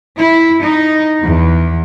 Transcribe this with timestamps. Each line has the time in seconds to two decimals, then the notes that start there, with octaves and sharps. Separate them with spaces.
0.17 E4
0.63 D#4
1.22 E2